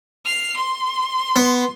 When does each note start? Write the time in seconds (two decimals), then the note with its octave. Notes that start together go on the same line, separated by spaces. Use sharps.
0.25 F6 C7
0.56 C6
1.36 B3